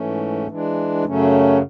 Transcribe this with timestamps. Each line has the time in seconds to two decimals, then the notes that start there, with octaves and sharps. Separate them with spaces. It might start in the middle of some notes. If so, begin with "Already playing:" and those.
Already playing: G#2 E3 A3 C#4
0.47 E3 G#3 D4
1.04 F#2 C#3 F#3 A3 C#4